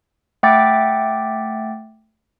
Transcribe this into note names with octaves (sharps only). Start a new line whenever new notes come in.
A3 E5 F#5 G5 D6 A6